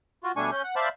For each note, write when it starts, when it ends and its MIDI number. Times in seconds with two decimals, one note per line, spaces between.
0.23 0.32 65
0.23 0.32 66
0.36 0.50 47
0.36 0.50 55
0.36 0.50 57
0.36 0.50 62
0.36 0.50 80
0.36 0.50 85
0.51 0.62 61
0.51 0.62 91
0.64 0.75 78
0.76 0.89 72
0.76 0.89 74
0.76 0.89 76
0.76 0.89 77
0.76 0.89 81
0.76 0.89 83